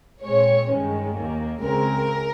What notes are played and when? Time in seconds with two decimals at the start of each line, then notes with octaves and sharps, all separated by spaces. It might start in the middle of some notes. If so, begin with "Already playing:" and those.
0.23 A#2 G#3 C4 C#5
0.70 G2 D#3 G#3 C#4
1.15 D#2 D#3 A#3
1.61 C#2 C#3 G#3 C4 A#4